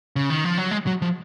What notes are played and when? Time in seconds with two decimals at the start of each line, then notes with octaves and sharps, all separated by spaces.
0.16 C#3
0.30 D#3
0.44 F3
0.58 F#3
0.71 G#3
0.87 F#3
1.02 F3